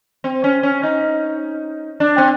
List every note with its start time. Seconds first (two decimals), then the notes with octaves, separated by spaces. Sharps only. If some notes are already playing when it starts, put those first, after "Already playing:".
0.24 C4
0.44 C#4
0.63 C#4
0.83 D#4
2.00 D4
2.18 C4